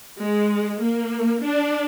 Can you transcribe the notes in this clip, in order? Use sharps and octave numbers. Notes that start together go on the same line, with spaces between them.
G#3
A#3
D4